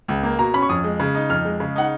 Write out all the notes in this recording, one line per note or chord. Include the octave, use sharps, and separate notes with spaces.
C#2
A#3
B2 A#5
C#4 B5
C#6
F2 D#6
G#3
C#3
D#4
F2 F6
G#3
C#3
D#4 F#5